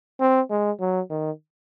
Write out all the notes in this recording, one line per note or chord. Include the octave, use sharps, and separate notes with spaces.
C4
G#3
F#3
D#3